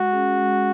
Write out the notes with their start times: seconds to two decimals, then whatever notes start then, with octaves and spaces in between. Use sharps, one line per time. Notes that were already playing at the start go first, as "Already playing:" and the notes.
Already playing: G#3 F#4
0.12 C#4 G#4
0.38 G#3